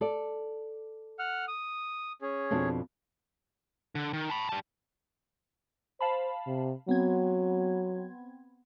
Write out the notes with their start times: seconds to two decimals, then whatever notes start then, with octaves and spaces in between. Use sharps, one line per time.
0.01 A4 D5
1.19 F#5 F6
1.48 D#6
2.22 C#4 G#4
2.51 F2 B2 D4
3.95 D3
4.13 D#3
4.30 A5 B5
4.49 G3 A5
6.01 C5 F5 A5 B5
6.47 C3
6.89 F#3 B3 C4 G#6